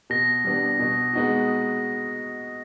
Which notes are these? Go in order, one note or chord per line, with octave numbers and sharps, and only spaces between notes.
B2 A#6
G3 B3 D4
B2
G#3 B3 D#4 F#4